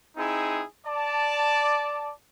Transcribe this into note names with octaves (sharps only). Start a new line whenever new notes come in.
C4 D#4 E4 G#4
D5 A5